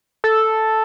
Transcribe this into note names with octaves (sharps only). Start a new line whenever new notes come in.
A4